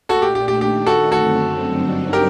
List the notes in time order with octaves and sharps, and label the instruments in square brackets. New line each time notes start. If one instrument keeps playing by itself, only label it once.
[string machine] A#2 A3 D4 [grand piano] F#4 A4
[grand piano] G4
G4
G4
[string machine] D#3 A3 D#4 [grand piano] G4
[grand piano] F#4 A4
[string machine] F#2 D3 A3 C4 [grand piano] F#4 A4
[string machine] G2 D3 F#3 C4 D#4
[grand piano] G4 A#4